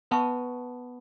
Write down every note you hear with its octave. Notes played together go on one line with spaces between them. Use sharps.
B3 B4 E5 A5 C#6